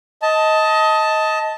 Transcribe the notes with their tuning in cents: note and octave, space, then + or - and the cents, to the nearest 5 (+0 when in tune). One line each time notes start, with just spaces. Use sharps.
D#5 +20 A5 +0